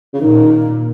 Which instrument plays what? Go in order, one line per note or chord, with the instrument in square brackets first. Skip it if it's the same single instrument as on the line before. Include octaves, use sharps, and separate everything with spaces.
[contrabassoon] C#3
[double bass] A#2 [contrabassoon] D#3